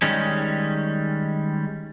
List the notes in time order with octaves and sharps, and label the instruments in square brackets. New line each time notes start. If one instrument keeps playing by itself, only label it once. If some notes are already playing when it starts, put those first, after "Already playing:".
[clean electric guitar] D#3 G3 G#3 C#4